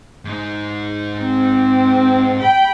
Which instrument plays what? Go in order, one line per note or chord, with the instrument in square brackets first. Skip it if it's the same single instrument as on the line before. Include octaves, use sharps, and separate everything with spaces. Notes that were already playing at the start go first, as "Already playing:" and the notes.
[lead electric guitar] G#2 D#4
[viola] C4
G5 B5